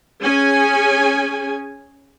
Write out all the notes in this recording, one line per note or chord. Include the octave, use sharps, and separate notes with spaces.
C#4 G#4 G#5